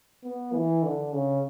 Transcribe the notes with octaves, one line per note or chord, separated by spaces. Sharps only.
B3
E3
D3
C#3